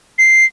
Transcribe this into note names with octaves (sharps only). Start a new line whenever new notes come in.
C7